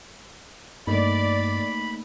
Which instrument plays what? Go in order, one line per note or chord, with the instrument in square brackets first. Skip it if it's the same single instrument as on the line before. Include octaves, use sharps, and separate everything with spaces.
[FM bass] G2 [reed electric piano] A3 A#3 D#4 [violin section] D5 [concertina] B5